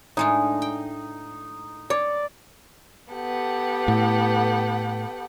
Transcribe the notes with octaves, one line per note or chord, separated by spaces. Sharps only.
A2 G#3 D4 D#4
G5
C#5 D5
B3 G4 A4 F#5 G5
A2